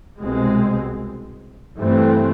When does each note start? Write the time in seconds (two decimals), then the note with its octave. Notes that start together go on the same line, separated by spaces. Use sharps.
0.19 C2 B2 G#3 C4
1.77 G2 E3 A3 C4